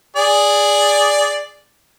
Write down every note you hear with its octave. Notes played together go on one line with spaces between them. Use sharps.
G#4 D5